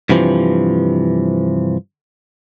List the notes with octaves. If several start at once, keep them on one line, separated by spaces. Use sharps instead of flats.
G2 C3 E3 F3